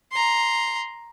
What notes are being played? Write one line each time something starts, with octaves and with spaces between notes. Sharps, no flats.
A#5 C6